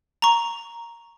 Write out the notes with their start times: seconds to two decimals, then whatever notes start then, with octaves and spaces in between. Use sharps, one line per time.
0.22 A#5 C#6